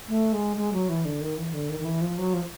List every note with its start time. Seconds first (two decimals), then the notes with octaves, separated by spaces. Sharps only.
0.08 A3
0.33 G#3
0.57 G#3
0.73 F#3
0.89 E3
1.05 D3
1.21 D#3
1.37 E3
1.53 D3
1.69 D#3
1.79 D#3
1.85 E3
2.01 F3
2.18 F#3
2.33 F3